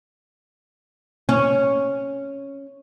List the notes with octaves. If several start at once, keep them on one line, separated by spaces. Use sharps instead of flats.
C#4